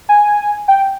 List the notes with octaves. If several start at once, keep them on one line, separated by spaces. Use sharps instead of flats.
G#5
G5